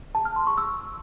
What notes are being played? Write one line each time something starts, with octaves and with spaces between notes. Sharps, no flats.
A5
F6
C6
C#6
E6